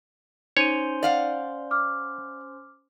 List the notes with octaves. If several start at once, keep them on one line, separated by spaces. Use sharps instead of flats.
C#4 D#4 C5 C#5 C6 D#7
D5 F5 F#5
D6 F6